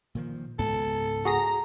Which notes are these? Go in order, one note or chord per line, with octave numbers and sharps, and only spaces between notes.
A#2 D#3 F3
C#2 G#2 B3 A4
F#4 G#4 A#5 A#6